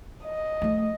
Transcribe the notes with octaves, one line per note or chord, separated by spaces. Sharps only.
D#5
F3 A3